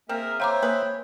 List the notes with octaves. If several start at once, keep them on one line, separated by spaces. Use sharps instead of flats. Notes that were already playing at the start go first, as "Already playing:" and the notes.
A#3 C4 G#4 A#4 E5
C5 C#5 E5 F5 G5 A#5 D6
A#3 G#4 B4